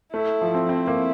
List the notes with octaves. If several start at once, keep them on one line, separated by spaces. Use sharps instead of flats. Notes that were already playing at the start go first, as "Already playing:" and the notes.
A3 E4
F3
C4
C4 E4
A#3